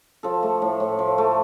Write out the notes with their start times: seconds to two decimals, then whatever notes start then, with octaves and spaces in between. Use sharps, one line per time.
0.23 F3 A4
0.43 A3
0.62 A2
0.80 A2
0.99 F3
1.18 A3